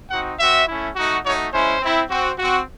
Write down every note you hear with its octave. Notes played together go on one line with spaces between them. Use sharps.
C4 D#4 F#4 F#5
C4 F#4 E5
A3 C#4 E4
A3 D#4 F#4
A3 D#4 F#4 C#5
G#3 C#4 E4 C5
C4 E4
C4 F#4
C4 F#4